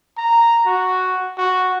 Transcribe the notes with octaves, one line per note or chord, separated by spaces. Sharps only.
A#5
F#4
F#4